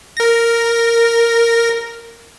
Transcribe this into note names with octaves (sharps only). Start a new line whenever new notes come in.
A#4 A#6